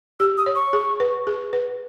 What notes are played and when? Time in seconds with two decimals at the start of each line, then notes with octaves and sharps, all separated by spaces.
0.20 G4 E6
0.38 D#6
0.46 C#5
0.55 C#6
0.73 G#4
1.00 B4
1.27 G#4
1.53 B4